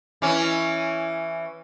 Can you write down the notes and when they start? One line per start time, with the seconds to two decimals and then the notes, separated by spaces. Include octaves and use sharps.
0.22 E3 C#4